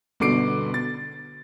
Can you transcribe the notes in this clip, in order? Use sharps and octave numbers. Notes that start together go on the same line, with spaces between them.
G1 B2 D3 D6 C7 D7
A6